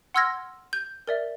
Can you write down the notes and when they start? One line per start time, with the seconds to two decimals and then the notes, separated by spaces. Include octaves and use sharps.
0.14 F#5 C6 E6 F6 G#6 A#6
0.73 G6
1.07 A#4 D5 E5